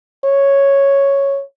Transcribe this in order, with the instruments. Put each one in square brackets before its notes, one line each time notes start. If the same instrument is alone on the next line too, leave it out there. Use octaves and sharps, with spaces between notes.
[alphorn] C#5